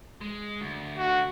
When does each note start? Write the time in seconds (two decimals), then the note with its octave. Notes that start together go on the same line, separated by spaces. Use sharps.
0.21 G#3
0.60 D2
0.97 F#4